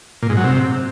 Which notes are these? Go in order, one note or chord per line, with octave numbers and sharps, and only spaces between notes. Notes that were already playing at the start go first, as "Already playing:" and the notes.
A#2
G#2
F#3
C3